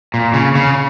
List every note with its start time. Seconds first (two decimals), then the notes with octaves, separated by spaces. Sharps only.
0.14 A#2
0.34 C#3
0.55 C#3